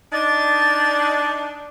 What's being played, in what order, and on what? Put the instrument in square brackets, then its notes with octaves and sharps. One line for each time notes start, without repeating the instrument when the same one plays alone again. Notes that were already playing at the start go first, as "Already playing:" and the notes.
[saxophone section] D4 D#4 [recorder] A6